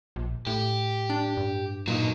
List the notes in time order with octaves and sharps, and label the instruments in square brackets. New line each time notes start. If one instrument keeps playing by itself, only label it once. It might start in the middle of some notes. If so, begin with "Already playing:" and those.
[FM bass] A#1
[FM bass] A2 [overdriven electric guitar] G4
[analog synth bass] D4
G2
[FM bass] A#2 [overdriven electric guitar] F#3 D#4